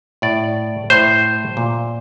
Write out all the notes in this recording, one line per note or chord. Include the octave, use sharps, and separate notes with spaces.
A2 D5
A2 C5
A#2